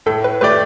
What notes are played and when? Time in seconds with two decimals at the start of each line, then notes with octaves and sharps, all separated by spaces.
0.06 A2 A4
0.24 B4
0.41 A3 G4 B4 D5